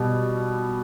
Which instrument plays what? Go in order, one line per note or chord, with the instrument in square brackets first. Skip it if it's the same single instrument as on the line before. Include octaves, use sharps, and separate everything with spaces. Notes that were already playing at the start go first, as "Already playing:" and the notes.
Already playing: [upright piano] B2 G3